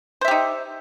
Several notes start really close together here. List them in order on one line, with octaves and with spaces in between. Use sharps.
C5 E5 G4 D#4